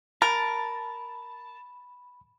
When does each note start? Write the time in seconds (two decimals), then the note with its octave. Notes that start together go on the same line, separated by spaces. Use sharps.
0.22 A#4 A5 B5